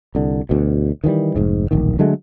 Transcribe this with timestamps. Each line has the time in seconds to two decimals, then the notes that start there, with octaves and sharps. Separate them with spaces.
0.15 C2 D3
0.49 D2 B2
1.04 D#3 E3 F#3 G3
1.36 F1 G#2
1.71 D1 A#1 D#3
1.99 D3 F#3 G#3 A3